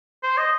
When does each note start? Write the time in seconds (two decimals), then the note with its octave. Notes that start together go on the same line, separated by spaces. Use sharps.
0.23 C5
0.38 D#5